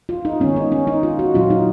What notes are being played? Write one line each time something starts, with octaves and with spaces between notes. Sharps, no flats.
F4
D#4
D#3 G#3 B3 C#4
D#4
C#4
D#4
F4
F#4
A#2 F#3 C#4 F4
D#4